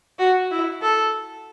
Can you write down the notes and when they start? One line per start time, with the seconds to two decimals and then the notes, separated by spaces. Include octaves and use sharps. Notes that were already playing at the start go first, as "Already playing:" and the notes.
0.18 F#4
0.51 E4
0.82 A4